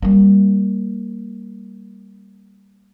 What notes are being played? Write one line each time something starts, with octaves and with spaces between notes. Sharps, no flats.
G3 A#3